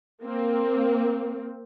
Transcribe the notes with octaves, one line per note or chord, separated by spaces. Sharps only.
A#3 C4